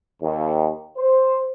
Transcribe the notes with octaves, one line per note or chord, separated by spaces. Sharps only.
D#2
C5